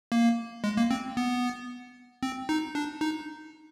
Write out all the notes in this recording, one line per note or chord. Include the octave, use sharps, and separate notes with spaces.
A#3
G#3
A#3
C4
B3
C4
D#4
D4
D#4